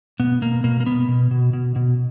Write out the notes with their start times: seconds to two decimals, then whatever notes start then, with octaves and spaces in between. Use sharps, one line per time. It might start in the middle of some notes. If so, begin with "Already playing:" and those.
0.20 B2 B3
0.42 B2 A#3
0.64 B2 A#3
0.80 A#3
0.86 B2 B3
1.08 B2
1.31 B2
1.53 B2
1.76 B2